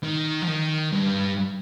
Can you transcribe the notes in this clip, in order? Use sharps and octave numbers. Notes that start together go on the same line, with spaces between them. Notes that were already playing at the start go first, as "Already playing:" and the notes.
D#3
F3
D#3
G2